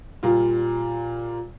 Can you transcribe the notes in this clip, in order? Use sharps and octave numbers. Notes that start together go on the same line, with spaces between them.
A#2 G3 F4